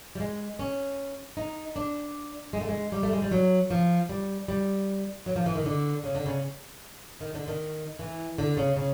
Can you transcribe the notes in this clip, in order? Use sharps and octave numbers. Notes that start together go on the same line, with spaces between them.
G3
G#3
C#4
D#4
D4
G#3
A3
G#3
G3
A3
G#3
G3
F#3
F3
G3
G3
F#3
F3
E3
D#3
D3
C#3
D3
C#3
D#3
D3
D#3
E3
D3
C#3
C#3